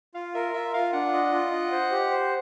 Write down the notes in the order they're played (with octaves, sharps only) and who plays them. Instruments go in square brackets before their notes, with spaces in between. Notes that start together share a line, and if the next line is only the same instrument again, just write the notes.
[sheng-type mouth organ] F4 [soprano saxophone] F5
[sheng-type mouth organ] A#4 [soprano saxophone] E5
[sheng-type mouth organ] F4 [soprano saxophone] E5
[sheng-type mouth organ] F4 [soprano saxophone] F5
[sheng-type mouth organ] D4 [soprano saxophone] F#5
[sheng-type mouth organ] D#5
F4
D#5
C5
G4
C5